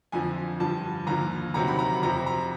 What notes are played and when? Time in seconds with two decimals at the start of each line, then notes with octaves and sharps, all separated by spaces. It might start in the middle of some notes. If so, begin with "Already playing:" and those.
0.12 F2 D3 F3 G#5
0.60 G2 D3 F3 A5
1.07 D#2 D3 F3 A#5
1.54 D2 C3 D#3 F#3 A#5
1.68 B5
1.79 A#5
2.03 F2 C3 F3 A#5
2.26 A#5